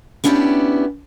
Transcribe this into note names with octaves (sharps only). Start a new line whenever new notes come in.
B3 C#4 D4 E4 F#4 G4